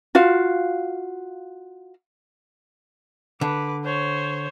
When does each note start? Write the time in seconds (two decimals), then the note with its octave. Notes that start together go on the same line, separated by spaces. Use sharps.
0.15 F4 F#4 F5
3.41 D3 B4 D6
3.84 C5 C#5